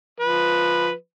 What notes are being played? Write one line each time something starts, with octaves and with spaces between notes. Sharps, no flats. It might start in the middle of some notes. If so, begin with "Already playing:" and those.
F3 B4